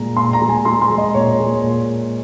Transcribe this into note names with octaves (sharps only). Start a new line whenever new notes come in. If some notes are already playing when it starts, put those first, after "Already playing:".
Already playing: A#2 G#3 A#5
A#2 C6
A#5
G#3
G#5
G#3 C6
C6
G#3
D#5
A#2 C#5
G#3
A#2